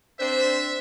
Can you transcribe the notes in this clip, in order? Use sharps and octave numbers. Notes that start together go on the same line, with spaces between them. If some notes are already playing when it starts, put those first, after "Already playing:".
C4 D4 C5 E5